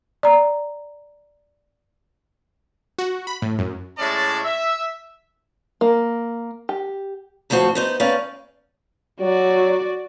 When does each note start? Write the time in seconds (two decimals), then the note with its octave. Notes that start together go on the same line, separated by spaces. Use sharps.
0.23 D5 A#5
2.98 F#4
3.27 B5
3.42 A2
3.59 F#2
3.98 A2 G#3 C#4 E4 D5 A5
4.45 E5
5.81 A#3
6.69 G4
7.50 D2 A2 F3 C4 F#4
7.75 B3 D#4 C5
8.00 B3 C#4 D#4 G#4 D5 F5
9.21 F#3 F#4 D5